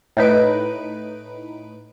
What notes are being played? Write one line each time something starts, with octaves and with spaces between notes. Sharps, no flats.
A2 D#4 B4 D7